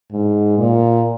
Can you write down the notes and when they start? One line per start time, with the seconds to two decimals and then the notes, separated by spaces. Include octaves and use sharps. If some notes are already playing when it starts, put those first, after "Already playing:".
0.12 G#2
0.58 A#2